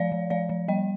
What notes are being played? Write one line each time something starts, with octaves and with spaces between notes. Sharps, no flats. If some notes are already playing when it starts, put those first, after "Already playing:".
Already playing: F3 D5 F5
F3
F3 D5 F5
F3
G3 D#5 G5